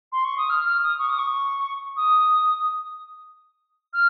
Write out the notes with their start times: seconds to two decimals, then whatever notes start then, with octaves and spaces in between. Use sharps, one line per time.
0.12 C6
0.25 C#6
0.38 D#6
0.50 F6
0.66 F6
0.83 D#6
0.99 C#6
1.09 D#6
1.19 C#6
1.97 D#6
3.94 F6